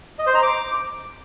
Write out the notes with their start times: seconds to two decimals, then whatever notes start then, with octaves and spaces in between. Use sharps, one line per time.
0.19 D#5
0.27 C5
0.35 A#5
0.42 D6